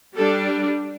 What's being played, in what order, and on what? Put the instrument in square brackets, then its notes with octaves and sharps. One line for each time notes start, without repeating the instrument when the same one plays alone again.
[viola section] G3 D4 A4